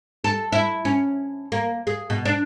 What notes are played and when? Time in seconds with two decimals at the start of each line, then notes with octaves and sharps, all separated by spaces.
0.24 A4
0.52 E4
0.85 C#4
1.52 A#3
1.87 G#4
2.10 B2
2.25 D4